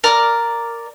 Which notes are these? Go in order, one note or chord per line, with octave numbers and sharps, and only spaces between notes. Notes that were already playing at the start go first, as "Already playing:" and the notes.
A#4 D5